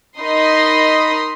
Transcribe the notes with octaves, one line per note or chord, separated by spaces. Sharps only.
D#4 A#4 D#5 B5 C6 D#6